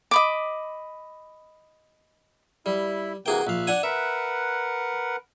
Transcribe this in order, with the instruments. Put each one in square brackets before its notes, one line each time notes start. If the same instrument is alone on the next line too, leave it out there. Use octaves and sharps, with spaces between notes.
[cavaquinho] D#5 B5 D6
[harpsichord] G3 [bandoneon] E4
[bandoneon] C3 E3 A#3 [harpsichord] F#4 G#4 G5
[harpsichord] A#1 F5 [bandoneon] E5 F#6
[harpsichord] D4 F#5 G#5
[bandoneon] A#4 B4 F#5 [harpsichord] E5